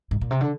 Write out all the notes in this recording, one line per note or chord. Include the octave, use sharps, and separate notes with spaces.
G#2
A#2
C3
D3